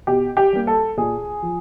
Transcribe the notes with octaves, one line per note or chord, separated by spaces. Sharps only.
B2 G4
G4
G3 A#3
A4
A#2 G#4
F3